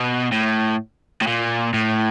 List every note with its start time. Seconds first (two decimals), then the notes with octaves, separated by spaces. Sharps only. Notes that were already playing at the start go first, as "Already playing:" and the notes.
Already playing: B2
0.32 A2
1.21 A2
1.27 A#2
1.74 A2